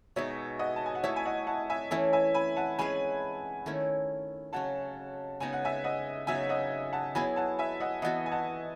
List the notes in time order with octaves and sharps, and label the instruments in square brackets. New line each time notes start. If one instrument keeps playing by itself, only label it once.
[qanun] B2 G#3 D#4 [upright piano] C#5 E5
[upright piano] D#5 F#5
A5
G#5
F#5
[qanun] A3 E4 A4 [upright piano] C#5 E5
[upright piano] G#5
D#5 F#5
F#5 A5
E5 G#5
[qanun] E3 A3 C#4 E4 [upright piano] E5 G#5
[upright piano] E5 G#5
G#5 B5
F#5 A5
[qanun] G#3 C#4 G#4 B4 [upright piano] G#5 B5
[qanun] D#3 A3 C#4 E4
[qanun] C#3 F#3 C#4 [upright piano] F#5 A5
[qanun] C#3 G#3 B3 D#4 [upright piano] G#5
[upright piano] F#5
E5 G#5
D#5 F#5
[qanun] C#3 F#3 B3 D#4 [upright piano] E5 G#5
[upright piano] D#5 F#5
F#5 A5
[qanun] F#3 B3 E4 G#4 [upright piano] G#5 B5
[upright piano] F#5 A5
E5 G#5
D#5 F#5
[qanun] E3 B3 F#4 [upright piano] D#5 F#5
[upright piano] G#5
F#5 A5